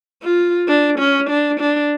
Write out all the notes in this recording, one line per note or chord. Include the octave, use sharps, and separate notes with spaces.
F4
D4
C#4
D4
D4